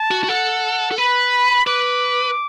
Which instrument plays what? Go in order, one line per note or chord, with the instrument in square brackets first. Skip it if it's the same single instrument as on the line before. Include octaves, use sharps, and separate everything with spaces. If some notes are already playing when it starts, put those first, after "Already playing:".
Already playing: [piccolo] A5
[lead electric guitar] F#4
F#4
[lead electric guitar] A4 [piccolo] F#5
[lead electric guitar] A4
[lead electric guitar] B4 [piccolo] B5
[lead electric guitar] B4 [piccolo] D6